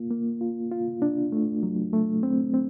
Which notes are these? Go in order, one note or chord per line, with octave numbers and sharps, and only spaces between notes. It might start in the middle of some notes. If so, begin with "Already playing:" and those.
Already playing: A#3 F4
A#3
F4
F4
D4
A3
F#3
A3
C4
C4